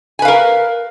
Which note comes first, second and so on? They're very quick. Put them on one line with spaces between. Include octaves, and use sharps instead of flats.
G#5 B4 F5 A#4